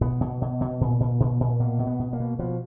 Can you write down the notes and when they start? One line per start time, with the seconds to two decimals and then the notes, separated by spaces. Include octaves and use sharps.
0.01 B2 B3
0.21 B2
0.42 B2
0.61 B2
0.81 A#2
1.00 A#2
1.20 A#2
1.40 A#2
1.60 B2 A#3
1.79 B2
1.87 B3
1.99 B2
2.13 A#3
2.20 B2
2.39 B2 F3